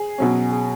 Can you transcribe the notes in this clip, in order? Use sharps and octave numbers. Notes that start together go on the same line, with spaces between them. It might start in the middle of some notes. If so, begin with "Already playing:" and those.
Already playing: G#4
B2 F#3 C#4
G#4